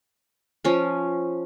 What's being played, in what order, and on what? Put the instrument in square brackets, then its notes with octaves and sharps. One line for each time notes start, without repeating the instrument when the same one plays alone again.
[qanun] F3 C#4